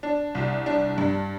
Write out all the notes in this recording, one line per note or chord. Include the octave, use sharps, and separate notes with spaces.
D4
C2
D4
G2